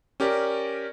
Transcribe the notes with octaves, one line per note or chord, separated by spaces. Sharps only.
C#4 G4 A#4 D5